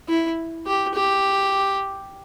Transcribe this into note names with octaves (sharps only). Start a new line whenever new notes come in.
E4
G4
G4